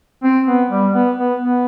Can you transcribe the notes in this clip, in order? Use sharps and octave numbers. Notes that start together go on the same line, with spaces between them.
C4
B3
G3
B3
B3
B3